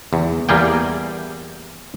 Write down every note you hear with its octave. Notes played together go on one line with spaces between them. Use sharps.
E2
E2 G3 A#3 G#4 G5